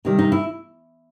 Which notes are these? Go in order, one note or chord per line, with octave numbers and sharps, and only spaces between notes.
C3 D#3 G3
D#4
E4